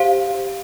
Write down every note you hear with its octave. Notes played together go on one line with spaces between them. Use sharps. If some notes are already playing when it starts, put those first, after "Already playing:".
Already playing: G4 C5 F5